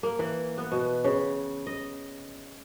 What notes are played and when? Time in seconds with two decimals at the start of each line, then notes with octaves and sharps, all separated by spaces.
0.03 A#3
0.19 E3
0.58 B3
0.72 B2
1.04 C#3
1.67 D#5